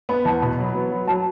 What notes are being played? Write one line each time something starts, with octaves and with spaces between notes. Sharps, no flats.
B3 B5
E2 A5
B2 B5
F#3
B3
F#3
F#3 A5